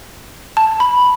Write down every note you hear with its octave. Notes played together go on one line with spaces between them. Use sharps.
A5
B5